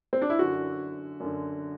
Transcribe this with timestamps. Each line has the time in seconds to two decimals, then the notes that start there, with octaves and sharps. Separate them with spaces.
0.13 C4
0.22 D4
0.30 E4
0.39 F#2 D3 F#4
1.20 F#2 D3